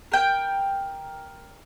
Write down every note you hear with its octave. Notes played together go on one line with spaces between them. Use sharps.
A#4 G5